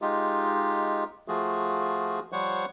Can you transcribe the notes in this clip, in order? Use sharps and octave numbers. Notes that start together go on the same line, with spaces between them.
G#3 D#4 F4 G4
F3 A3 F4 F#4 G#4
F3 G3 C5 C#5 F#5 C#6